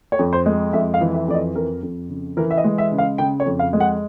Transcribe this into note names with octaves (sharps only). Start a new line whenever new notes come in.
C#5
F2
C5
G#3
F2 E5
F5
E3
E5
F2 D5
D#5
F2 A#4
F2
C#3
E3 A#4
E5
D#5
G#3
E5
C#3
F5
C#3 G5
C#5
F2
F5
G#3
F#5